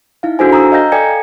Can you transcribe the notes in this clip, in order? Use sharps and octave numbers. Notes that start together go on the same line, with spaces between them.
D#4 E4 F5
D4 F#4 G#4 A4 C5 G#5
A#5 D#6 E6
D#5 F5 G5 A#5 G6 A#6
A4 D5 G5 G#5 G#6 C#7